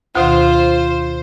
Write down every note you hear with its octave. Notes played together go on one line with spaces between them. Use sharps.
D2 B2 D#3 F4 C5